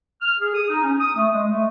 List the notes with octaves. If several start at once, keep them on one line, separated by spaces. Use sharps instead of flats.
F6
G#4
D#6
D#4
C#4
D#6
A3
G#3
A3